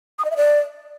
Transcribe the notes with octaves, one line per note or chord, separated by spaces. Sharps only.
D#6
D#5
E5
D5